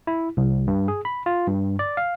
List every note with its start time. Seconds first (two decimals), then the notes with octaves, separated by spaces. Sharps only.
0.07 E4
0.37 C2
0.67 G2
0.88 G#4
1.05 B5
1.26 F4
1.47 G2
1.79 D5
1.97 F5